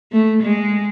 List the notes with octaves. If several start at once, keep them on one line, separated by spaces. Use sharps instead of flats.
A3
G#3